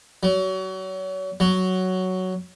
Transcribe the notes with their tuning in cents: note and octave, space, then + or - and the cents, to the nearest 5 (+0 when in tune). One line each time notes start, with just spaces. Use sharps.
F#3 +30
F#3 +5